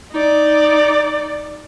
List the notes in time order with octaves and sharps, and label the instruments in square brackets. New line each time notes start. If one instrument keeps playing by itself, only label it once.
[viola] D#4 D5